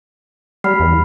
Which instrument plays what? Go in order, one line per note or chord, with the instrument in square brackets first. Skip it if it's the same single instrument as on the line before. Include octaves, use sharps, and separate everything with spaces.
[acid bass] G3 [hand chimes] B5 F6 C7
[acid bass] E2